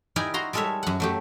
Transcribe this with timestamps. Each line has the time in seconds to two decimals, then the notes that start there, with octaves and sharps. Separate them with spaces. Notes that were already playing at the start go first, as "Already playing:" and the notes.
0.16 D#4 E4 G4 A#4 D5 G#5
0.34 F#4 A#5 C6
0.53 G3 G#3 A4 A#4 C#5 E5
0.83 F#2 F#5
1.00 F#3 A3 G4